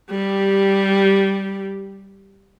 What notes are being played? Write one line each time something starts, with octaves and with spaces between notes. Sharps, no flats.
G3 G4